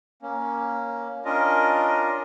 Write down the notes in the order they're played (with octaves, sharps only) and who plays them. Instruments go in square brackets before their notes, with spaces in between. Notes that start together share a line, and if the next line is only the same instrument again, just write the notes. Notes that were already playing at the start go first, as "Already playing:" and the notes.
[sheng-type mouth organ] A#3 C#4
C#4 D4 F4 A#4 D#5